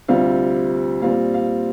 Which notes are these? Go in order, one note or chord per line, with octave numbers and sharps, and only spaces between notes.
D2 C3 G3 C4 F4 F5
A#2 G3 C4 F4 F5
F5